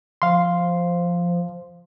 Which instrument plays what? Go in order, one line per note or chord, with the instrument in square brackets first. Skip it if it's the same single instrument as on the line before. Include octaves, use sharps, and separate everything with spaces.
[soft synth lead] F3 [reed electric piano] F5 C6